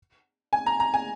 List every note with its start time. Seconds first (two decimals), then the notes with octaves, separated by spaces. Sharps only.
0.53 G#5
0.66 A#5
0.80 A#5
0.94 G#5